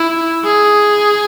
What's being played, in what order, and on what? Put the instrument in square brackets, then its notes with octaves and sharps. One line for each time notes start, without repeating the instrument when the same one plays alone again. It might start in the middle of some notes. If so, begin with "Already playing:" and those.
Already playing: [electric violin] E4
G#4